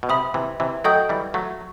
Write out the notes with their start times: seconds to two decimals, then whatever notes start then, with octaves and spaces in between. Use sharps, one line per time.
0.03 B2
0.09 C3 E5 B5 D#6
0.34 C3 E3
0.60 C3 E3
0.84 F#3 A3 A4 D#5 G5 D#6 G6
1.09 E3 G3
1.34 F#3 A3